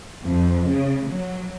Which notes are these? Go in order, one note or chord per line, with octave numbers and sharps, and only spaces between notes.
F2
C#3
F#3